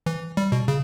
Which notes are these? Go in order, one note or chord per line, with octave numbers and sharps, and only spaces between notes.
E3
G3
B2
C#3